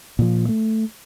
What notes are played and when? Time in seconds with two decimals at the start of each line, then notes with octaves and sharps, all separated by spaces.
0.19 A#2 F3
0.49 A3